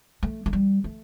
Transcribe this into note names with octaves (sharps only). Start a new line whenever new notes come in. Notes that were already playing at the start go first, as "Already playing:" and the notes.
A3
A3
G3
A3